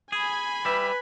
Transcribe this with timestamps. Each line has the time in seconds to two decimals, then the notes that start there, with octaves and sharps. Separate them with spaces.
0.12 G#4 G#5 B5
0.65 G3 B4 E5